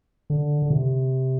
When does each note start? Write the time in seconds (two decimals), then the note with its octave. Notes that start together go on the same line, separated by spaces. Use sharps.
0.30 D3
0.62 D3
0.70 C3